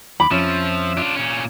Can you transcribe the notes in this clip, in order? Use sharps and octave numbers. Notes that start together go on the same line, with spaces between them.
D#2 B5 D6
F2 F3 C#4 E5
D4 F4
A#2 C#4